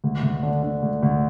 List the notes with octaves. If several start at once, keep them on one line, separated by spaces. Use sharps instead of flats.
D2
D2
D3
D3
D2
D2